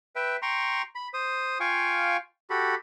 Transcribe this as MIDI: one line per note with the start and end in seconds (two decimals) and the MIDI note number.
0.16 0.36 71
0.16 0.36 76
0.16 0.36 79
0.42 0.82 79
0.42 0.82 82
0.42 0.82 84
0.42 0.82 85
0.95 1.08 83
1.14 1.58 72
1.14 1.58 87
1.60 2.17 65
1.60 2.17 77
1.60 2.17 79
1.60 2.17 80
1.60 2.17 85
2.50 2.75 66
2.50 2.75 67
2.50 2.75 69
2.50 2.75 83